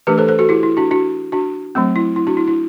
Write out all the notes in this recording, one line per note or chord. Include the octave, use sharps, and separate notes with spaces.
E3 A3 D4 G4 B4
A4 C5
A4 C5
F#4 A4
E4 G4
E4
D4 F#4
D4 F#4
D4 F#4
F#3 A3 C4
E4
E4
D4 F#4
E4
E4